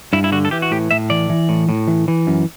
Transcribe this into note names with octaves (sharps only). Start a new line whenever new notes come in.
G2 E4
E4
D3 F#4
A4
E3 G4
F#4
A2 G4
A2 E5
E3 D5
E3
A2
A2
E3
E3
F#2